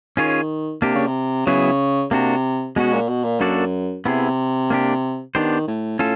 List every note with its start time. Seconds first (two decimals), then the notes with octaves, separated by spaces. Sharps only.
0.17 D#3 C#4 F4 G#4 C#5
0.82 C3 A#3 D4 G4
0.95 C#3
1.07 C3
1.46 C#3 F#3 B3 E4 G#4
2.11 C3 A#3 D4 F#4
2.76 B2 G#3 C#4 F#4
2.93 A#2
3.08 B2
3.24 A#2
3.40 F#2 A#3 D4 F#4 A4 D5
4.05 C3 B3 E4 G#4
4.70 A#3 D4 G4
5.35 D#3 B3 D4 G4 C5
5.68 A2
5.99 A2 C#4 F4 A4